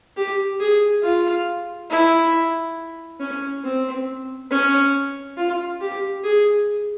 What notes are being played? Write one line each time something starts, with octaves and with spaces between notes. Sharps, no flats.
G4
G#4
F4
E4
C#4
C4
C#4
F4
G4
G#4